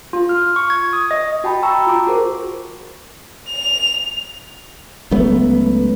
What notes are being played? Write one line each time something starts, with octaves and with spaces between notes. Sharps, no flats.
F4
F6
C#6
G#6
D#6
D#5
F#4 G5 A5 B5
G5 A5 A#5 C#6 E6
F4 D6
F#4 G#4 A#4 C5
F7
C#2 F#3 A3 B3